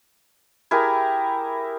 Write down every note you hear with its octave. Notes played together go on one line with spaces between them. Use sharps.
E4 G4 G#4 A#4